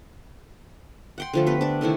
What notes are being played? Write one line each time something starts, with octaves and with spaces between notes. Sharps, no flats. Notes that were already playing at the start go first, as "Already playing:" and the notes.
F#5 G5 C6
D3 F3 A3
B3 G4 B4
D4 D5
C3 D#3 A3 E4